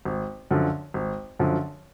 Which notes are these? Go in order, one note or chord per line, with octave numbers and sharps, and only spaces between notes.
G#1
F#2 D3 F3
G#1
F#2 D3 F3